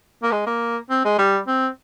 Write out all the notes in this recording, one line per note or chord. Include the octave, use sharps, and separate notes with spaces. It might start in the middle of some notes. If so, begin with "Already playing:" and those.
A#3
G#3
A#3
C4
G#3
G3
C4